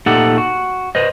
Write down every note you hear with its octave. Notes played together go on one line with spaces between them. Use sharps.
A#2 A3 D#4 G4 A4 F#5
F#4
B4 C5 D#5